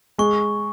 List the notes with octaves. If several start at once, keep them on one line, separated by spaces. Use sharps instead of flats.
G#3 C#6